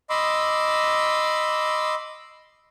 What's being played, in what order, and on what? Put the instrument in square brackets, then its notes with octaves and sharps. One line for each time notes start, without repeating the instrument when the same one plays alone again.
[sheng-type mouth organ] D#5 B5 C6 D6 E6